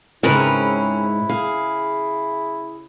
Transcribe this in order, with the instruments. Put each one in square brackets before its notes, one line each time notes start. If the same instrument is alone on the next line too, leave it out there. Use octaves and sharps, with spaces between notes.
[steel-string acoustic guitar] G#2 [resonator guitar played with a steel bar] C#3 A#4 B4 [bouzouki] C4 C#4 [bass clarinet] E4
[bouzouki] G#4 [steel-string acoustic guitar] F5